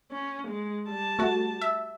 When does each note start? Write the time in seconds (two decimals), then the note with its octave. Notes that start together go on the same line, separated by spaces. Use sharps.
0.12 C#4
0.48 G#3
0.88 G3 A5
1.19 A3 F#4
1.61 E5